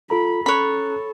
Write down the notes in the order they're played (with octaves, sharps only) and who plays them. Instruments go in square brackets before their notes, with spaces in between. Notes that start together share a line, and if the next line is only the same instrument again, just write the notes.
[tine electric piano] F4 A4 A#5 [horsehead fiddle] B5
[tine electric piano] C#4 A#5 F#6 [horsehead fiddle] A4 [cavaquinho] C#5 B5